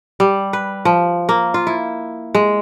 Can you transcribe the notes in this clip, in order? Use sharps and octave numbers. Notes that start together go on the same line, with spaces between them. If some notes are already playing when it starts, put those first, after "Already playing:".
G3
B4
F3
A#3
F4
E4
G#3